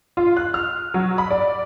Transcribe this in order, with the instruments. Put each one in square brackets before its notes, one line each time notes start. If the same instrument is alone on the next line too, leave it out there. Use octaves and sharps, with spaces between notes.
[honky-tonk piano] F4
F#6
F6
F#3
B5
D5